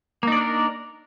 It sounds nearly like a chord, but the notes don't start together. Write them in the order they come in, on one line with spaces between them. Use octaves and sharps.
A#3 D#4 D5 D4 A#4